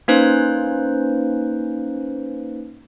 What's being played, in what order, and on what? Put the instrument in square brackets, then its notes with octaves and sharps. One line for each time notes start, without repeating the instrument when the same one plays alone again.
[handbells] A#3 C#4 D#4 B4 C5